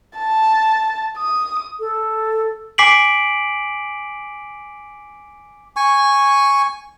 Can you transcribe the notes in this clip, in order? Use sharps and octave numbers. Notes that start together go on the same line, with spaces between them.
A5
D#6
A4
G#5 D6 B6 C7 D7 F#7
G#5 C#6